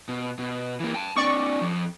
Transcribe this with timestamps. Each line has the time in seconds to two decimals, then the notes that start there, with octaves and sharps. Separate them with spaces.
0.09 B2
0.39 B2
0.80 E3 A#3
0.94 G5 A5
1.16 C4 D4 D5 C#6
1.62 F2